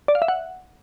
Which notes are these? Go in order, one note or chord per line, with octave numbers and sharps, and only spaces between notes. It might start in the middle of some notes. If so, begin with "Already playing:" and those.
D5
F5
E5
F#5